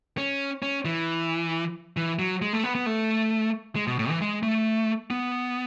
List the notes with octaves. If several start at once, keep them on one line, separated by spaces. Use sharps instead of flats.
C#4
C#4
E3
E3
F#3
G#3
A3
B3
B3
A3
G#3
B2
A2
E3
G#3
A3
B3